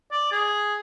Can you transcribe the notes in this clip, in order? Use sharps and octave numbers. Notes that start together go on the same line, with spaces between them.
D5
G#4